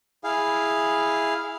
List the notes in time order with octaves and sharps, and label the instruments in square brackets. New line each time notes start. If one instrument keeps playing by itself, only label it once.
[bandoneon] E4 G#4 F5